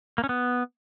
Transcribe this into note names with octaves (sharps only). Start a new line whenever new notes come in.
A#3
C#4
B3